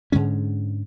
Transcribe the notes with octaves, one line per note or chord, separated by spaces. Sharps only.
G#2 D3 G#3 C#4